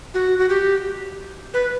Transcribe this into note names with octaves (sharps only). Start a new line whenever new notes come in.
F#4
F#4
G4
B4